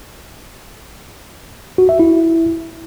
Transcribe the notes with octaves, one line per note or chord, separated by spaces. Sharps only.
F#4
E5
E4